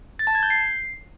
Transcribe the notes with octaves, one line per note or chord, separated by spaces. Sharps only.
A6
A5
G#6
G6
C7